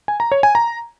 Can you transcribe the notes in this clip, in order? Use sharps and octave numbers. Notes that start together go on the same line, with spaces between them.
G#5
A#5
C#5
G#5
A#5